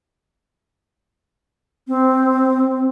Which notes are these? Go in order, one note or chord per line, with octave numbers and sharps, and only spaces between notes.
C4